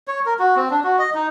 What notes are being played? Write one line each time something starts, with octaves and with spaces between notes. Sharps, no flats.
C#5
A#4
F#4
C4
D4
F#4
D#5
D#4